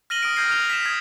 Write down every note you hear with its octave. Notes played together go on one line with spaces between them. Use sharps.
F6 A#6 D#7 F#7 G7
D#6 F6 D7
F6 G6 G#6 A#6 C7 D#7
D#6 F6 C7 F7 G7
B6 E7
D#6 G#6